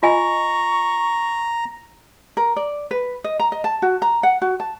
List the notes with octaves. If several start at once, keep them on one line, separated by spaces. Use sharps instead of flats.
F4 D#5 G#5 A#5 C#6
A#4
D5
B4
D#5
A#5
D#5
A5
F#4
A#5
F#5
F#4
A5